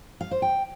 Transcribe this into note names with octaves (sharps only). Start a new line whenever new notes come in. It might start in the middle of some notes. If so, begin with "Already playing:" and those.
F5
C5
G5